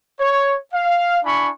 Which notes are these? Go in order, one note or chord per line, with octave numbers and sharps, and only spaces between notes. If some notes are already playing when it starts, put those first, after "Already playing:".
C#5
F5
D4 E4 G#5 B5 C#6